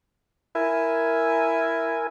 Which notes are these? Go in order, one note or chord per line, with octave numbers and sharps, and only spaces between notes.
E4 A#4 G#5